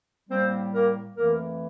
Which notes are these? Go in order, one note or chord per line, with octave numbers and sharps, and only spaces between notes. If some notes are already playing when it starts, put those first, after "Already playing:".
A2 G3 A#3 C4 C5
A#3 A#4
F2 E3 A3 A#3 A#4